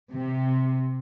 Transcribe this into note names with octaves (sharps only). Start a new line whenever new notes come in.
C3